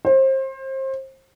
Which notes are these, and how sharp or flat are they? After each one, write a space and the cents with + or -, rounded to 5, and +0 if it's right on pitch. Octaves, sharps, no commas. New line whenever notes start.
C5 +30